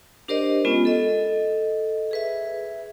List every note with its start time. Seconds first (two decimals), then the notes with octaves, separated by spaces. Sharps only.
0.28 D4 G4 A#4 C5 D5 D#5
0.65 G#3 B3 C#4 F4
0.85 A4 D#5
2.11 G#4 B4 E5